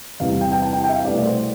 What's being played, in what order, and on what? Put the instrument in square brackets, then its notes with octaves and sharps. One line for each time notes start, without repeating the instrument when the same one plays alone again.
[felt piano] E2 C3 G3 F5
F5
G5
G5
A5
G5
G5
E5
F5
C2 B2 A3 D5
D5
C5